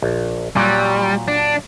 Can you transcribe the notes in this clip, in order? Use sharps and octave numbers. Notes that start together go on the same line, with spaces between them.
A#1
A#2 F#3 G3
D4